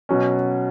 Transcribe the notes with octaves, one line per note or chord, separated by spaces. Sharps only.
B2 F#3 C#4